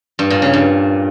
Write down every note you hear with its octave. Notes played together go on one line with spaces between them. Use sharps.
G2
A#2
C#3
G2